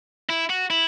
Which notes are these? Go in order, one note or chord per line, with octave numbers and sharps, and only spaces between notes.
E4
F#4
E4